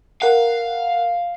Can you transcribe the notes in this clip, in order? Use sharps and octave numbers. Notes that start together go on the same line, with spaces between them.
A#4 F5 F#5